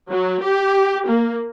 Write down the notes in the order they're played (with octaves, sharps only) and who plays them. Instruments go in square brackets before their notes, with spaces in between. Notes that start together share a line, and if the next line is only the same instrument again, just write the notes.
[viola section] F#3
G4
A#3